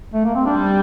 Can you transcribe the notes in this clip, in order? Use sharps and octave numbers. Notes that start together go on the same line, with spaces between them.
A3
A#3
C4
G3 D4